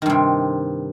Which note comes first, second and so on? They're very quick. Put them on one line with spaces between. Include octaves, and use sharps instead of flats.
D#3 G2 C3